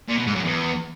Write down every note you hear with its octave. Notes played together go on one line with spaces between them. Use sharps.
A#2
B2
G#2
F#2
E2